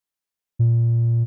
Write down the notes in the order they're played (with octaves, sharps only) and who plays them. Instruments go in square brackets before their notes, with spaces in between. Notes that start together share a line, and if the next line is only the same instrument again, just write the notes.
[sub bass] A#2